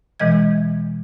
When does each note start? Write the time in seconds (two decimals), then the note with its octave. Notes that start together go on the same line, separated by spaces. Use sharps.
0.20 B2 E3 G#3 D#5 G#6